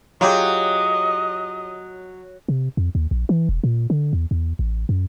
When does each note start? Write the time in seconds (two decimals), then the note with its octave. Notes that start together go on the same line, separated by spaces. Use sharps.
0.21 F#3 F4 G4 G#4 D#5
2.48 C3
2.77 F2
2.95 D#2
3.11 A#1
3.29 E3
3.49 E1
3.64 A#2
3.90 D3
4.13 E2
4.31 E2
4.59 A1
4.89 F#2